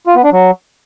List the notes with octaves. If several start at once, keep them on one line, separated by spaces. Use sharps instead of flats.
F4
B3
D4
F#3